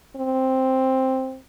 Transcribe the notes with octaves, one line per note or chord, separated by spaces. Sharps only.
C4